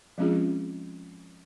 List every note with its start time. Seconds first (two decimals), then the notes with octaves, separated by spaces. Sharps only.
0.18 F3 G#3 C4 C#4 F4 G#4